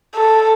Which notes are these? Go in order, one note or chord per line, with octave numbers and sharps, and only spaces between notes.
A4